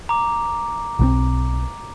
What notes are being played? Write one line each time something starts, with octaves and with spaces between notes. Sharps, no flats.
A#5 D6
B1 F#3 C4